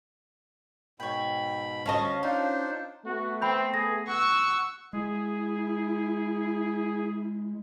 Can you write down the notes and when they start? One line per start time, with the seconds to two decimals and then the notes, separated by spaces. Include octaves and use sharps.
1.00 G#2 B2 C#5 G5 B5
1.86 D2 C#4 C#5 D#5 F5 A5 C#6
2.23 D4 D#4 F4 C5
3.06 A3 B3 F#4
3.42 C4 G5 B5 G6
3.74 G#4 A#6
4.08 F#5 C#6 E6
4.93 G#3 E4 G#4